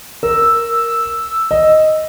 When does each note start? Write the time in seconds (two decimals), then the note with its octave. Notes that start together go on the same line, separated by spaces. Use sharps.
0.23 A#4 E6
1.51 D#5